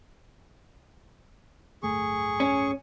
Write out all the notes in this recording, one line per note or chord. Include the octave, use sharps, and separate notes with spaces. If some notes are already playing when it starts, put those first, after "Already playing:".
D1 G1 A3 G#4 C#6
C#4